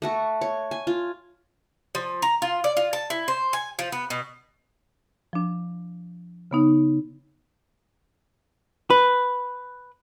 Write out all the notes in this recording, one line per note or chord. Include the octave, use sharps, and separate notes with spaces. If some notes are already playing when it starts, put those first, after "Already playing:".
A3 F#4 A4
C#5
G#5
F4
F3
A#5
F4
D5
F4
A5
E4
C5
G#5
F3
B3
B2
F3 D4
C#3 B3 D#4
B4